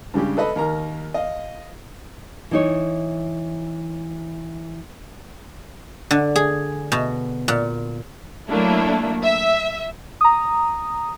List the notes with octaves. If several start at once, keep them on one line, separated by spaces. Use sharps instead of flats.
G2 C#3 G3 G#3 G4
A4 B4 D#5 B5
D#2 A#4 A#5
D#5 F5
E3 D#4 C#5
D3
G#4
B2
A#2
F#3 A3 A#3 D4 E4
E5
A#5 D#6